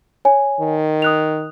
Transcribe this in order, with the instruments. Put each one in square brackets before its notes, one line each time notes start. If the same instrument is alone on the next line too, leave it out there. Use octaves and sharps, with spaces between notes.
[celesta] C#5 G#5
[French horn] D#3
[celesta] D#6 F#6 F7